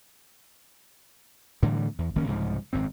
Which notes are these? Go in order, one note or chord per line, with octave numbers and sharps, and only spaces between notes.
A2 D3 E3 G3
E2
E1 D#3 A#3 C#4
C2 G#2 C#3 F3
G#1 F#2 C4